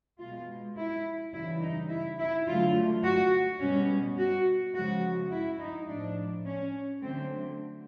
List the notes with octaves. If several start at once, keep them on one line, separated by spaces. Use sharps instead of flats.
B2 G#3 F4
E4
C#3 E3 G3 E4
D#4
E4
E4
D3 F#3 A3 F4
F#4
B2 G3 C#4
F#4
C#3 F3 G#3 F#4
E4
D#4
A2 F3 A3 D4
C#4
D3 F#3 A3 C4